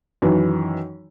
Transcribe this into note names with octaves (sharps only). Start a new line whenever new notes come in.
F#2 D#3 E3